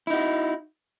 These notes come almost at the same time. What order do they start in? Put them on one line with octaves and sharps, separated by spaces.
E4 D#4 F#4